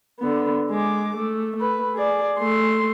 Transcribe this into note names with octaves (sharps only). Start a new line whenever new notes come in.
D3 B3
G#3 D6
A3
A3 B4
G#4 D5
A3 C6